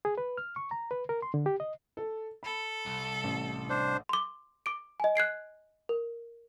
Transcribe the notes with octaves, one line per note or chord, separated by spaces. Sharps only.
G#4
B4
F6
C#6
A#5
B4
A#4
C6
D3
G4
D#5
A4
A4 B5
C2
A1
D4 C5
C6 D6
D6 D7
D#5 G#5
F#6 G#6 C7 D7
A#4